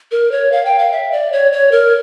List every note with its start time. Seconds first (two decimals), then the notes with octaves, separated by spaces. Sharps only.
0.12 A#4
0.32 C#5
0.52 F5
0.65 G5
0.78 F5
0.92 E5
1.12 D5
1.32 C#5
1.52 C#5
1.72 A#4